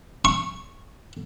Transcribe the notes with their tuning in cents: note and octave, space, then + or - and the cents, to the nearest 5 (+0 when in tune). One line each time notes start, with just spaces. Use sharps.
C#6 -5